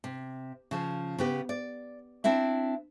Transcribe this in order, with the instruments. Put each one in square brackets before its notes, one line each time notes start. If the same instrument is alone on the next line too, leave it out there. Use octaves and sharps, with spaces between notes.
[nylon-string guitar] C3
C#3 F3
C#3 B3 G4
D5
C4 D4 E4 E5